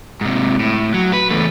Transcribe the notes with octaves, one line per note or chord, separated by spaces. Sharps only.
G#2 C3
A2
F#3
B4
E2 A3